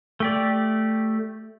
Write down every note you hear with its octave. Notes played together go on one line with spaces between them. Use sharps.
A3 G4 D5